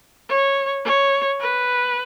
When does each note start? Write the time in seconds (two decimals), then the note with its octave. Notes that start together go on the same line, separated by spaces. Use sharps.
0.29 C#5
0.85 C#5
1.40 B4